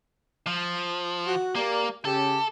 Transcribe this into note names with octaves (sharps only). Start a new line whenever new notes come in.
F3
F#4
A#3 G4 A#4 D5
C#3 C#4 G4 A4